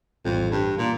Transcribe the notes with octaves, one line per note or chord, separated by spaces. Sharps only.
A#1 F2 A2 E3 G3
G2
A#2